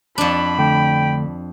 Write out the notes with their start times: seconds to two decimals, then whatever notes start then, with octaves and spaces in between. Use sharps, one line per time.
0.18 F2 D4 B5
0.59 D3 A3 G5